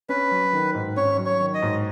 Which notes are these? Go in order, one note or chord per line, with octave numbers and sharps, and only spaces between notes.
C#4 B4
F#3
D#3
G#2
C#4 C#5
F#3
C#5
D#3
D#5
G#2